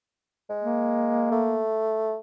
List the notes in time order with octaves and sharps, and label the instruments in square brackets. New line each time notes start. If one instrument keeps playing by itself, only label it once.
[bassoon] G#3
[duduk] A#3
[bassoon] A3